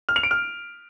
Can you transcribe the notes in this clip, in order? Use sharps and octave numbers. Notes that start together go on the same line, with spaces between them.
F6
F7
D7
F6